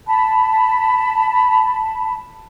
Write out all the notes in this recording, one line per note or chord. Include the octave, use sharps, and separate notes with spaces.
A5 B5